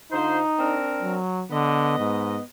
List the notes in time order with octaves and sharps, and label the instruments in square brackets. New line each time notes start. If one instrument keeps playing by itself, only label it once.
[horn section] D3 F4 C5 [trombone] D#4
[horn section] C4 D4 A#4
[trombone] F#3
[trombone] D3 [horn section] B3 D#5
[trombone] G#2